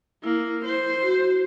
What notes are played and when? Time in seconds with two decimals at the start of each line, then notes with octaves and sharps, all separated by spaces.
0.24 A#3 E4
0.65 C5
1.03 F#4